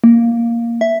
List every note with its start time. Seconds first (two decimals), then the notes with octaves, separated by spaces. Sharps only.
0.04 A#3
0.81 E5